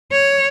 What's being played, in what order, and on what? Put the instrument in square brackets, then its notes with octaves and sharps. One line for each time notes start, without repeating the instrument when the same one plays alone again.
[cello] C#5